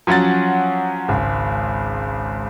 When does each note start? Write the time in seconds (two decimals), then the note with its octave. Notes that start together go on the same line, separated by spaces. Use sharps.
0.07 F3 F#3 C#4 F#5 A6
1.08 G#1 C#2